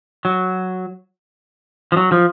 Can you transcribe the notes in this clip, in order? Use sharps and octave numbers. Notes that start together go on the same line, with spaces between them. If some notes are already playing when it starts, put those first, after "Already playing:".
F#3
F3
F#3
F3